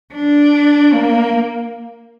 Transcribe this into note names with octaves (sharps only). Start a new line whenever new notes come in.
D4
A#3